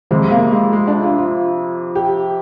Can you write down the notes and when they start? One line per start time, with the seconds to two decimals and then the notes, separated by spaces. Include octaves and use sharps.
0.11 F2 C3 F3 G#3
0.31 A#3
0.51 G#3
0.72 G#3
0.88 D4
1.03 F4
1.18 F4
1.95 G4